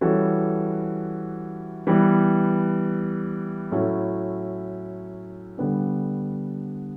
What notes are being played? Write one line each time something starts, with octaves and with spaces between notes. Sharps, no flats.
E3 G3 C#4 F#4 A4
E3 G3 B3
A2 F#3 C#4 E4 A4
D3 G3 B3 D4